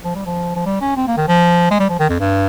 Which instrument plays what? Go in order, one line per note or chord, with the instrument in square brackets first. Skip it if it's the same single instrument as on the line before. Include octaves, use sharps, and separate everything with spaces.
[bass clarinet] F3
G3
F3
F3
G3
C#4
C4
A#3
D#3
F3
G#3
G3
F3
D#3
F2
G2